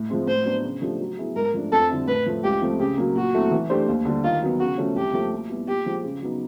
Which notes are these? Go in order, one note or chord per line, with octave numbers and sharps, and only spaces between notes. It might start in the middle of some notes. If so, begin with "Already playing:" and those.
Already playing: A2
F3 G#3 C4
A2 C5
F#3 B3 D4 F#4
C#3
F3 A3 D4 G4
F#3
B3 E4 G#4
G#2 A#4
F3 A3 D4
F2 A4
D3 G3 C4 E4
A2 B4
F3 A3
C#2 G4
C3 F3 A3
C#3 G4
F#3 A#3
A#2 F#4
F#3 A3 C4 E4
E3
A3 D4 G4 C5
D#2
D3 G3
D#3 F4
F#3 B3
C#3 F#4
F3 A3 C#4 F#4
C2 G4
A#2 F3 A3
A#2
G3 B3 E4
A#2 G4
F3 G#3
C#3
F#3 B3 D#4